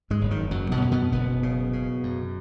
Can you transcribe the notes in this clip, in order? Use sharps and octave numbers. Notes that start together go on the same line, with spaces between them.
G#2 G#3
F#1
D#3
F#2 F#3
B2 B3
F#2
B2 B3
F#1 B2 B3
C#3
C#3
F#2